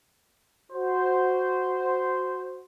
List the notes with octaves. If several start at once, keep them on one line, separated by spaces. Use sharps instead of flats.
F#4 C5